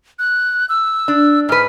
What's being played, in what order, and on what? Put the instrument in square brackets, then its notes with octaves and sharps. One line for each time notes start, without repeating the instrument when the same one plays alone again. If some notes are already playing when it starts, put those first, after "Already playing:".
[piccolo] F#6
E6
[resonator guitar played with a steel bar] D4
[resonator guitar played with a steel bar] G#2 B4 [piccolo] F6